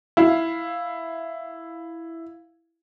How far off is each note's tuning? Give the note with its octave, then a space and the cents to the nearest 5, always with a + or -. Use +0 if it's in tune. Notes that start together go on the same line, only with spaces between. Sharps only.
E4 +0 F5 +0